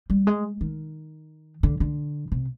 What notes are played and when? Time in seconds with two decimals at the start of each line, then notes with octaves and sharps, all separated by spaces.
0.10 G3
0.27 G#3
0.61 D#3
1.63 D3
1.80 D3
2.32 C3